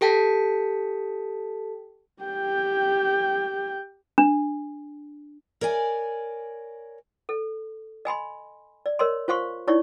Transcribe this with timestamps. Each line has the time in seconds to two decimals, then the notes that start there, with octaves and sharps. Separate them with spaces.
0.01 G4 A4 G5 A5 B6
2.23 G4 G5
4.18 D4
5.61 A#4 C#5 D5 G#5
7.29 A4
8.05 D#5 G#5 B5 C6
8.86 D5
8.99 A#4 C#5 D#5 C6
9.28 F4 C5 F5 C6 C#6
9.67 D#4 E4 C#5 D5 C#6